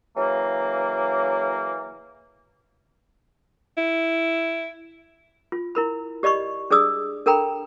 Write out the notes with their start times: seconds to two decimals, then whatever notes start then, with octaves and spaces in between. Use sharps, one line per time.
0.16 C#3 E3 F#3 A#3
3.77 E4
5.52 F4
5.75 E4 A#4 B5
6.23 G4 D5 D#5 B5 C#6
6.71 D4 G#4 D5 D#6 E6
7.26 D4 A4 A#4 G5 A#5 B5